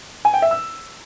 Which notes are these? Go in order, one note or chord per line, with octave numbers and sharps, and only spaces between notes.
G#5
G5
E5
E6